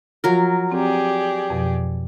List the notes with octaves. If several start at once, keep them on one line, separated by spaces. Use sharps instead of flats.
F3 F#3 F4 A#4
C4 G4 G#4 D5
F2 B2 F3